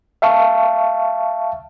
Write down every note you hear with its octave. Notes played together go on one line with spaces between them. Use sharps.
E5 F5 A5 C#6